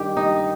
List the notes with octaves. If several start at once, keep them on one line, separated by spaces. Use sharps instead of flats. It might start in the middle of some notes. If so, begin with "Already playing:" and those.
Already playing: G2 D#3 G3 G4
D#4